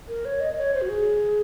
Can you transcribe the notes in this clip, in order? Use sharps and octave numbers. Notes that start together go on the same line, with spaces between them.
A#4
C#5
D#5
D#5
C#5
C5
F#4
G#4